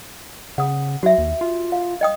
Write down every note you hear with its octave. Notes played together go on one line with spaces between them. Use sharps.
C#3 F#5 D#6
F#3 F#4 E5
D#2
F4
F5
D#5 G5 D#6